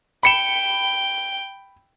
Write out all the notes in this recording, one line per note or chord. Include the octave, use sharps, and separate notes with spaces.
G5 B5 C#7 E7